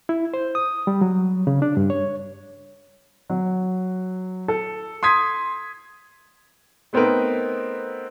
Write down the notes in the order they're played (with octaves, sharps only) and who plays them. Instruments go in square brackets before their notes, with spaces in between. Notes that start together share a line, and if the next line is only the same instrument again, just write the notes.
[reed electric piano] E4
C5
D#6
G3
F#3
C#3
D4
G2
C#5
[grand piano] F#3
A4
C6 D#6 G#6 B6
[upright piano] A3 B3 C4 D#4 A#4 B4